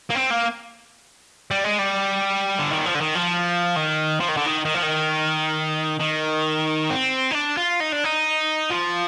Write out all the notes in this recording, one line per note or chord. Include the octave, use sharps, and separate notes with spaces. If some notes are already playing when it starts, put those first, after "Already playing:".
A#3
C4
A#3
G3
G#3
G3
D3
D#3
F3
D3
D#3
F3
D#3
F3
D#3
D3
D#3
D#3
F3
D#3
D#3
C4
D#4
D4
F4
D#4
D4
D#4
F3